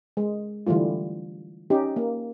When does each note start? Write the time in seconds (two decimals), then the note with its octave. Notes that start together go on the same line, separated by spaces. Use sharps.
0.17 G#3
0.67 D3 E3 G3 A3 F4
1.70 C#4 D#4 G4
1.96 A#3